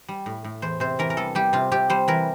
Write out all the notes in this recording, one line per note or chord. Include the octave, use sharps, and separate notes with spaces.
G3
A2
A2
E2 C5
C3 C5
E3 A#4
A#4
G3 A4
G3 G4
C3 F4
C3 G4
G3 C5
E3 A#4